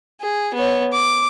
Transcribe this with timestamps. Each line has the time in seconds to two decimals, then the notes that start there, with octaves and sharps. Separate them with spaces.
0.21 G#4
0.54 B3 C#5
0.92 D6